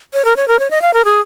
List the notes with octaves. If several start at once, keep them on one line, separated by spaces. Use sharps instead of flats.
C#5
A#4
C#5
A#4
C#5
D#5
F5
A#4
G#4